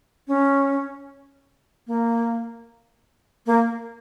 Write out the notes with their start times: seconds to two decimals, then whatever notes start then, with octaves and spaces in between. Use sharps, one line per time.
0.28 C#4
1.87 A#3
3.46 A#3